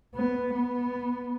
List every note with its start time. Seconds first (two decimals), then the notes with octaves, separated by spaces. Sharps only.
0.15 B3
0.54 B3